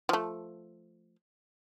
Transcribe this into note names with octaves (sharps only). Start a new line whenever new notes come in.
F3 A3